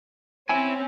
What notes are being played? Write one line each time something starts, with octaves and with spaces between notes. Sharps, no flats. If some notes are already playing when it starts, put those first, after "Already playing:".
C4 C#4 E4 G#5